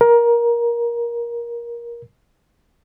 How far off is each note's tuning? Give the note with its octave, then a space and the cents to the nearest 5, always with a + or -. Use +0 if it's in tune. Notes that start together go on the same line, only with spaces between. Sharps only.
A#4 +20